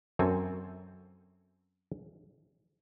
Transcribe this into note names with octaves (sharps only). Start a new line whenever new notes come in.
F#2 C4 A4 G#5